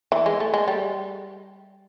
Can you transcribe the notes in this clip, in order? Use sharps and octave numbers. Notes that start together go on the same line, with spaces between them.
E3
G#3
A3
G#3
G3